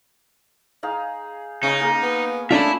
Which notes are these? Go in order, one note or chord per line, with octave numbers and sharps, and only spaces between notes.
D#4 G#4 F5
C#3 C#4 D#4 D#5 B5
A#3 G#4 A#4
B3
A3 C#4 D4 F4 E5 B5